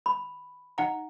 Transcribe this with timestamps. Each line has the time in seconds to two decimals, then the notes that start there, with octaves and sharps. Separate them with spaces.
0.06 B5
0.78 D#4 F#5 A#5